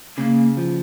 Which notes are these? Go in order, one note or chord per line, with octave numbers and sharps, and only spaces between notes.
C#3 A#3
F3